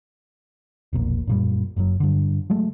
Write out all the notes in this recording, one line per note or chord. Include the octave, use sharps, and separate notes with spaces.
E1 A#1 A#2
F#2 A#2 G3
F#1 F#2 A#2 F#3
G2 D3
F#3 G#3 A3